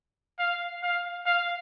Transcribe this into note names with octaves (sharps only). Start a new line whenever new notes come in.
F5
F5
F5